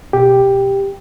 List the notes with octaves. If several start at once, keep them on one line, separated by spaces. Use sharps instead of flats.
B2 G4